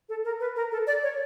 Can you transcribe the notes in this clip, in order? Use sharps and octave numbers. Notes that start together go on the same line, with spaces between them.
A4
A#4
B4
A#4
A4
D5
C#5